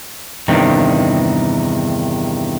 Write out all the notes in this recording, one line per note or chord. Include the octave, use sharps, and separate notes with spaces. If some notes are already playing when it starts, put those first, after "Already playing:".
E2 G2 C3 D#3